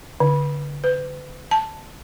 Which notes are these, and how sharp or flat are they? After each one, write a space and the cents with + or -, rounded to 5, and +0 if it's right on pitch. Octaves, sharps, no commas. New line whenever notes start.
D3 -30
B4 +40
A5 +0